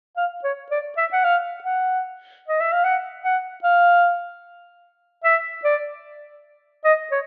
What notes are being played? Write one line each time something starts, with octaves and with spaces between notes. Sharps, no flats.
F5
C#5
D5
E5
F#5
F5
F#5
D#5
E5
F5
F#5
F#5
F5
E5
D5
D#5
C#5